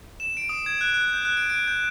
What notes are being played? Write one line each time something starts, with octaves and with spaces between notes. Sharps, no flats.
E7
D7
D#6
G#6
F#6
F#6
G6
F#6
D7
D7
G6